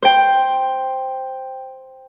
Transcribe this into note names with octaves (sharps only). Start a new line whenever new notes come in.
C5 G5